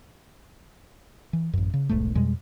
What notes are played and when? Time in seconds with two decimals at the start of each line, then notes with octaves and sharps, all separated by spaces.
1.33 E3
1.53 A1 F#2
1.74 C#3
1.89 D#1 B1 G#2 A3
2.15 F2 B2 G3 G#3